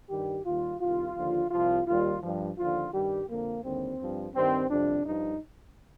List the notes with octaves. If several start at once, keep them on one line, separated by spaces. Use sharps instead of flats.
G2 D#3 G3 G4
D#2 D#3 G3 F4
C2 C3 D#3 F4
D#2 D3 F3
C2 C3 F3 F4
D#2 D#3 G3 F4
G2 F3
D#2 D3 F3 F4
G2 D#3 G3 G4
F2 D3 F3 A#3
D#2 D3 G3 C4
G2 F3
G2 D#3 G3 C4
F2 C3 G3 D4
G2 F3 D#4